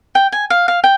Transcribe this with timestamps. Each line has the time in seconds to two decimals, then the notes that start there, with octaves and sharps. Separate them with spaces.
0.15 G5
0.32 G#5
0.50 F5
0.68 F5
0.84 G5